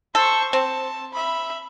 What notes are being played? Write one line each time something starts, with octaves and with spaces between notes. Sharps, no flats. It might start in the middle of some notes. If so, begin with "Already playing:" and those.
A4 C5 C#6
C4 A5
E5 B5